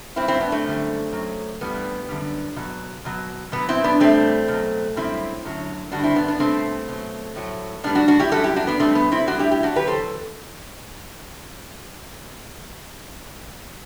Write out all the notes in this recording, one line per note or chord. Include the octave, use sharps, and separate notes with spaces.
G2 F#3 C4 E4
C4 E4
B3 D4
A3 C4
F#2 D3 G3
F#2 F#3
G2 E3 G3 B3
F#2 D3 G3
B2 F#3
B2 F#3
B2 F#3 B3
C4 E4
B3 D4
A2 E3 G3 A3 C4
B2 F#3
F#2 D3 G3 C4 E4
F#2 D3 F#3
G2 D3 G3 D4 F#4
C4 E4
B3 D4
B3 D4
B2 G3 A3 C4
B2 F#3
A2 F#3
A2 G3 B3 D4
D4 F#4
D4 F#4
E4 G4
F#2 E3 G3 F#4 A4
E4 G4
D4 F#4
B3 D4
B2 G3 A3 C4
B3
C4 E4
A2 E3 G3 D4 F#4
E4 G4
E4 G4
D4 F#4
E2 D3 F#3 G4 B4
A4 C5